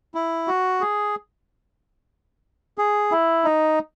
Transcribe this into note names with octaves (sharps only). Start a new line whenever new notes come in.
E4
F#4
G#4
G#4
E4
D#4